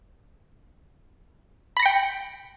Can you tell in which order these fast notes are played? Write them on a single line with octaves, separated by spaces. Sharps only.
B5 A#6 C#7 G5